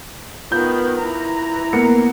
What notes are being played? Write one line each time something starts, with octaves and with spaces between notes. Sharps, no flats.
D#3 B3 F4 G6
E3 A#5
A#3 B3 C#7